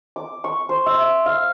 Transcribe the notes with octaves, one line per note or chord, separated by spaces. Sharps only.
D6
C#6
C5
E5
F5